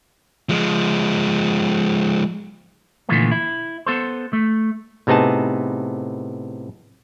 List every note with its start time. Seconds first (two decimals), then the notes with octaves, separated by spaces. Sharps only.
0.49 F3 G#3
3.09 A#2 D3 E3 F3 A3 B3
3.31 E4
3.86 B3 A4 C5
4.33 A3
5.07 A2 C3 B3 D#4 G#4 A5